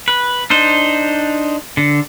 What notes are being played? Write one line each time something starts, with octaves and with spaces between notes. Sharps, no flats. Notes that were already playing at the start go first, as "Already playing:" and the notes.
B4
D4 D#4 C5
D3